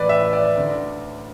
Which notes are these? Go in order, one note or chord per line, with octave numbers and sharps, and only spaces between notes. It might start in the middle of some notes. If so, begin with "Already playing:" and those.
Already playing: A1 A2 E3 B4 D5
E5
D5
D2 D3